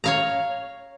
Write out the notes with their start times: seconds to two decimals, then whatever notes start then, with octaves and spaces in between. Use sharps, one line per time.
0.04 C#5 F5 A#5